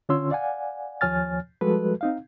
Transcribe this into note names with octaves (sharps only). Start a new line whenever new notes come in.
D3 C#4 F4 C#5 C6 E6
D5 F5 F#5 G#5
D#2 F3 C#5 G#5 F6 A6
F3 G3 G#3 F#4 A4 B4
C4 D#4 F5